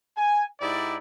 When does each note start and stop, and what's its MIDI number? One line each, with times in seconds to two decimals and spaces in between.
0.16 0.44 80
0.60 0.97 44
0.60 0.97 63
0.60 0.97 64
0.60 0.97 67
0.60 0.97 74